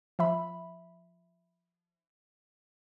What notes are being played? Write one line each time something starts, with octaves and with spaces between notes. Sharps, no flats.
F3 E5 B5